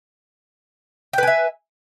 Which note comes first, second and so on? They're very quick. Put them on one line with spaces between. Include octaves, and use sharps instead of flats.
G5 B4 G#5 E5